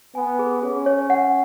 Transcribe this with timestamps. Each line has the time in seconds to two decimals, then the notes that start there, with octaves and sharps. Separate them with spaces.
0.15 B3 G#5
0.39 G#4
0.62 C#4 G#4
0.86 C#5
1.10 F#5